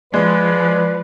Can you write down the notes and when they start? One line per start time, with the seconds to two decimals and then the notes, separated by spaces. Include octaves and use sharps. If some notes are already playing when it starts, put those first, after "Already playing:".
0.14 F3 G#3 B4 D5